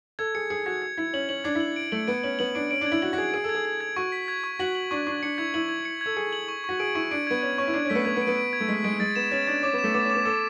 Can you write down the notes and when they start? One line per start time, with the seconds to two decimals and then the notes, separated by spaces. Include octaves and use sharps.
0.19 A4 G#6
0.35 G#4 C#7
0.50 G#4 C#7
0.66 F#4 G#6
0.82 G#6
0.97 E4 G#6
1.13 C#4 F#7
1.29 C#4 F#7
1.44 D4 G#6
1.55 E4
1.60 F#7
1.76 D7
1.92 A3 F#7
2.08 B3 D7
2.23 C#4 F#7
2.39 B3 F#7
2.55 D4 D7
2.71 C#4 D7
2.81 D4
2.86 G#6
2.92 E4
3.02 F#4 F#7
3.13 F#4
3.18 G#4 G#6
3.34 G#4 D7
3.44 A4
3.49 G#6
3.55 G#4
3.65 G#6
3.81 G#6
3.96 F#4 C#6
4.12 B6
4.28 G#6
4.44 C#6
4.59 F#4 F#7
4.75 F#7
4.91 D4 C#6
5.07 D4 C#6
5.23 D4 C#7
5.38 E4 G#6
5.54 E4 F#7
5.69 G#6
5.85 C#7
6.01 A4 G#6
6.17 G#4 C#7
6.33 F#7
6.48 C#6
6.64 F#4 C#6
6.80 G#4 D7
6.95 E4 C#6
7.11 D4 D7
7.27 B3 G#6
7.42 C#4 G#6
7.58 C#4 C#6
7.67 E4
7.74 D4 G#6
7.85 C#4
7.90 A3 B6
7.95 B3
8.05 B3 G#6
8.16 B3
8.21 D7
8.27 B3
8.37 D7
8.53 G#6
8.60 A3
8.68 G#3 B6
8.84 G#3 D7
9.00 G#3 A6
9.16 B3 E7
9.31 C#4 A6
9.47 D4 A6
9.63 C#4 D6
9.73 B3
9.78 E7
9.84 A3
9.94 B3 D6
10.05 C#4
10.10 D6
10.15 B3
10.25 A4 D6